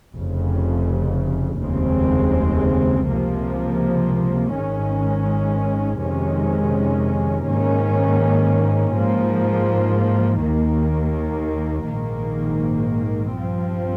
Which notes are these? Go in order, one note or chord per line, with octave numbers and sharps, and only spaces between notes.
F1 F2 C#3
F1 D#2 C#3 G#3 C4
C#2 C3 F3 A#3
G#1 G#2 D#3 G#3 C#4
F2 C3 D#3 G#3 C#4
G#2 D#3 A#3 C#4
G#2 F3 A#3
D#2 D#3 A#3
A#1 G#2 D#3 A#3
G2 F3 C4